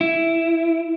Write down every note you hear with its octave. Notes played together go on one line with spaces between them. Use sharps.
E4